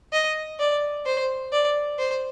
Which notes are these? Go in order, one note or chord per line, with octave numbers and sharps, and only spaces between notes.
D#5
D5
C5
D5
C5